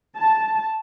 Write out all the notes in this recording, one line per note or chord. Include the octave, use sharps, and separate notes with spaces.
A5